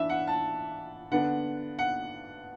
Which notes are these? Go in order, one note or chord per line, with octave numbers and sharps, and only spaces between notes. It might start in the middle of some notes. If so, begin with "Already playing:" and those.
Already playing: E3 D4 E5
F#5
A5
D3 B3 D4 F#5
F#5